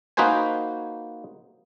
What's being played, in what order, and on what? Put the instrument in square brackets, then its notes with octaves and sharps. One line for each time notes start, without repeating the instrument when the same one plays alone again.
[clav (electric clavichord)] A#3 D#4 F#4 B4 C5 G#5